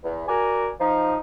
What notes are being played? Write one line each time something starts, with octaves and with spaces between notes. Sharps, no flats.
E2
F#4 A#4 D5 G#5
F3 D#4